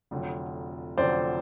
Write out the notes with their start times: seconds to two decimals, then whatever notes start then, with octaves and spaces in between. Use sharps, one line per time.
0.11 F1 F2 D3 F#3
0.97 F1 F2 D3 F#3 C5 D5